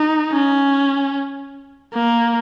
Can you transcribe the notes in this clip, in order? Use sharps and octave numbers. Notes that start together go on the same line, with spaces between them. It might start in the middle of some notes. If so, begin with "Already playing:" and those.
Already playing: D#4
C#4
A#3